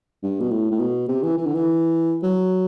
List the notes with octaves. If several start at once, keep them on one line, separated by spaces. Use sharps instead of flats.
G2
B2
A2
A2
B2
C3
E3
E3
D3
E3
F#3